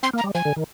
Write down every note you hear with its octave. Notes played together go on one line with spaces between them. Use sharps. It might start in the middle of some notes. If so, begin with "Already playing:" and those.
C4 C6
A#3
A#5
G3
F3 G#5
D3
D#3